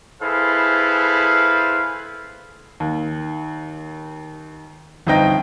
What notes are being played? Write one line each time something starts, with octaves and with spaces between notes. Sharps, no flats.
E4 G#4 A4 B4 C5 F5
D#2
G1 C4 D#4 D#5 G5 A#6